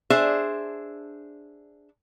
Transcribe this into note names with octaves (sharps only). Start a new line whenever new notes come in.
D4 G#4 C5 E5